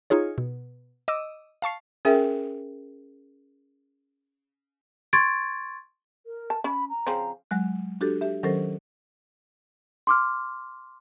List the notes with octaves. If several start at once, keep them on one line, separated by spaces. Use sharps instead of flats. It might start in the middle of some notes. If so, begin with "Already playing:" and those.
D#4 F4 G#4 C#5
B2
D#5 D6 E6
F5 A5 C#6 C7
C#4 G#4 A#4 E5 G5
C6 C#6 G#6 A6 D7
A#4
A5
C#4 B5
A#5
C#3 F3 C4
F#3 G#3 F#6
D4 F#4 G4 A4
G4 E5
D#3 F#3 C#4 A4 A#4 C5
C6 D6 F6